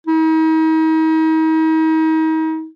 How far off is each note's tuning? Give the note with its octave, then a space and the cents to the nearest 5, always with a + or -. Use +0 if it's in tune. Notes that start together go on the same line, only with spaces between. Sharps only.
D#4 +40